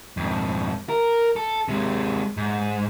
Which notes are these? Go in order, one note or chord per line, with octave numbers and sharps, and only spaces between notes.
F2 G#2
A#4
A4
C3 G#3
G#2